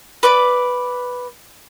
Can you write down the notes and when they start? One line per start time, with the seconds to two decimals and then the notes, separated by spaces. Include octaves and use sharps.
0.23 B4 D5 D6